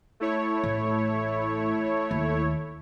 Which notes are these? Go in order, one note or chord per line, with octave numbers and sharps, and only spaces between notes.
A3 E4 C#5
A1
D#2